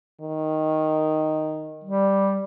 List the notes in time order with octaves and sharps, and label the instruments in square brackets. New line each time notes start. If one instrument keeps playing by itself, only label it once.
[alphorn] D#3
[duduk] G3